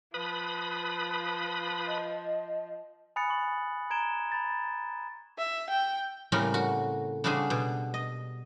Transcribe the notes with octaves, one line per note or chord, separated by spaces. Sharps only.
F3 B4 B5 D#6
D#5
G#5 B5 D#6 F#6 A6 C#7
C#6 F#7
A#5 G#6 D7 E7 G7
B5 A6
E5
G5
A2 C#3 G3 C4 C#4 A#4
F#4
C#3 G3 D4 F#4 G#4 C5
B2
D#5